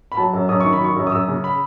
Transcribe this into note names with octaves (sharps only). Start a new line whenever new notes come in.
B5
F#3 A5
F#2
F#2 D#6
D#3 C#6
B5
F#3 C#6
F#2
D#6
F#2 E6
C#3
B5